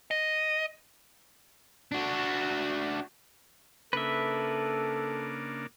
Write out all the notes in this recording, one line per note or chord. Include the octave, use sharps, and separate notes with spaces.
D#5
D4 F#4
C#3 A#3 D4 A4 B4 E5